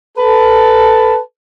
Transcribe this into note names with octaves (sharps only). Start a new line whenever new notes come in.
A4 B4 A5